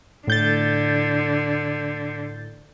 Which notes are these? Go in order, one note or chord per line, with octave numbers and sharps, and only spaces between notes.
A2 D3 G6 A6